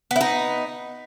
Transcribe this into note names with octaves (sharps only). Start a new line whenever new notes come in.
B3 D#4 E4